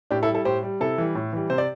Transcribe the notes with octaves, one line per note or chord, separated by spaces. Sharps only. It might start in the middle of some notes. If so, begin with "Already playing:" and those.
A2 D4 G4
E4 A4
G3
E4 A4
A2 G4 C5
G3
C3 E4 A4
E3 G3
A2
E3 G3
C3 C5
D5